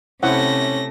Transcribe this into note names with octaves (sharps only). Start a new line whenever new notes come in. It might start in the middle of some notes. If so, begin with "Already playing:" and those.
C3 A3 C#4 E4 C5 F#5 A#6